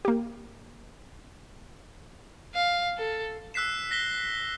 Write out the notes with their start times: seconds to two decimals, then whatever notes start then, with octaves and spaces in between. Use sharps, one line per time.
0.05 A#3 G4
2.54 F5
2.98 A4
3.54 E6 F#6 B6 C7 E7
3.91 A#6 B6 G7